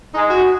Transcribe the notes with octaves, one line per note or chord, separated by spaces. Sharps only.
G#3 D#4
F#4